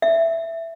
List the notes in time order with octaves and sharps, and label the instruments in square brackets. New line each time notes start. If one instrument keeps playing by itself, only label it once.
[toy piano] E5